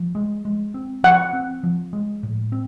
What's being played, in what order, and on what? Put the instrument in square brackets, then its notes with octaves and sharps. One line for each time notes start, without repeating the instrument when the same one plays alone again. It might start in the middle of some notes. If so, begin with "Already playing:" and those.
Already playing: [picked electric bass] F3
G#3
G#3
C4
[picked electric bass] F3 [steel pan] F#5
[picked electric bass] C4
F3
G#3
A2
C4